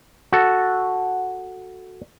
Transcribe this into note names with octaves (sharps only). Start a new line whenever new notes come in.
F#4 A4